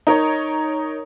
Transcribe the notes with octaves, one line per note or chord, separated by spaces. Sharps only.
D#4 A#4 C#5